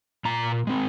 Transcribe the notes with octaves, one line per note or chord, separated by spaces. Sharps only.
A#2 A#5
G#3 C4